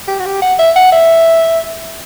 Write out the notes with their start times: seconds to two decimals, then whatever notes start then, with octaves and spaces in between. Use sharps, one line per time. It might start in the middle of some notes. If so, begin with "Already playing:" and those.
0.08 G4
0.19 F#4
0.26 G4
0.42 F#5
0.59 E5
0.76 F#5
0.92 E5